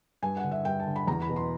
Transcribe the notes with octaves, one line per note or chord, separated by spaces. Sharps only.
G2 G#5
F#5
D3
E5
G2 G5
A5
D3
B5
E2 A#5
B5
B2
C6